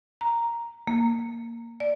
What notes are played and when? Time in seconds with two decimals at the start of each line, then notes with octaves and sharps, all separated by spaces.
0.21 A#5
0.87 A#3
1.80 D5